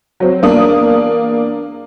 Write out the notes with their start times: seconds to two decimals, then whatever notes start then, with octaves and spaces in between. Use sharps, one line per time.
0.20 F#3 C4
0.42 E2 A#3 D4 D#6